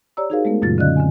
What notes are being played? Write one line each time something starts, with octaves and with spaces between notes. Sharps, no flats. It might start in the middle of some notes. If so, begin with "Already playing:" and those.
G4 C#5 D5 A#5 E6
D#4 F#4 G#4 A#4 C5 F5
G#3 A3 B3 A#4
F#2 A#2 C#3 F#3 F4 A6
D3 C#4 D5 D#5 F5 F#6
D3 C4 G#5